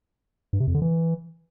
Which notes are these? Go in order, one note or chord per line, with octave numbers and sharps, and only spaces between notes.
G2
C3
F2
D3
E3